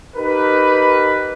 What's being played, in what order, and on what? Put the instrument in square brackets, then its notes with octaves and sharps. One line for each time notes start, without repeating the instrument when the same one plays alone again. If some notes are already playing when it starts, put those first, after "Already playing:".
[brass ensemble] D#4 G4 A#4 B4